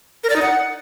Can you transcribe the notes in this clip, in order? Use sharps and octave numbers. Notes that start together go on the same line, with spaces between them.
A#4
D5
D#4
F#5